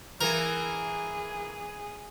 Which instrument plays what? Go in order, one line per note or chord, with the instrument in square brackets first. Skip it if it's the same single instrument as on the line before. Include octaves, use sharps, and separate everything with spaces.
[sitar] E3 A#3 [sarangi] G#4 [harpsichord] A#4